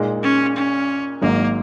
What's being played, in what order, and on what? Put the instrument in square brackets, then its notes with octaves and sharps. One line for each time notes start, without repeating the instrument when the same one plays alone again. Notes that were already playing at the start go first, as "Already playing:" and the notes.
Already playing: [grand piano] A#2 G#3 D#4
[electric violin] C#4
C#4
[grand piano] G#1 G#2 F#3 [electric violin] A#3